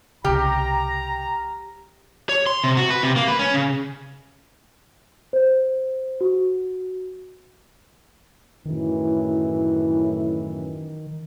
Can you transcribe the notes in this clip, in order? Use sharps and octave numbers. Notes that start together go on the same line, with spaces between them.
C2 C#3 G4 G5 A#5 F6
C#5
C6
C3
F#4
B4
C3
A#3
B4
C#4
C#3
C5
F#4
F#2 A2 D#3 E3